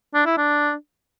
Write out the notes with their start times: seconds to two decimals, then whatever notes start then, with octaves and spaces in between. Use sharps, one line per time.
0.15 D4
0.26 E4
0.37 D4